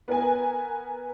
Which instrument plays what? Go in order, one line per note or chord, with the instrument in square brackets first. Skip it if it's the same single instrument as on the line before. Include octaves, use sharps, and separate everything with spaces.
[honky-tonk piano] B3 A#4 B4 G#5